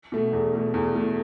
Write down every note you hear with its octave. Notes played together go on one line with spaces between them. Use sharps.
B2 A3
E2
B2 A3
E2
B2 A3